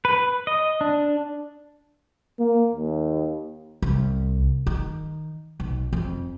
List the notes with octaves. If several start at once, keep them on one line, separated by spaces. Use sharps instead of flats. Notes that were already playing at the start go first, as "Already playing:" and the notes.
B4
D#5
D4
A#3
D#2
C2
D#3
B1
F2